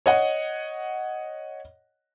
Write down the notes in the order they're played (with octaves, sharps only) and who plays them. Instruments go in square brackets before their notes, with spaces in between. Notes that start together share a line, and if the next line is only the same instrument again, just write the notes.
[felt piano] C#5 D#5 F#5